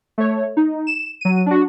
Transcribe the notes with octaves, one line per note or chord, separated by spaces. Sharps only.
A3 C#5
D#4
E7
F#3 D#7
D4 F#4